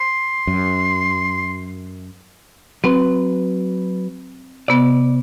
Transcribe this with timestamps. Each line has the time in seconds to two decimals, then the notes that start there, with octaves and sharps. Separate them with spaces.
0.01 C6
0.47 F#2
2.84 F#3 C4 B4
4.68 C3 B3 D5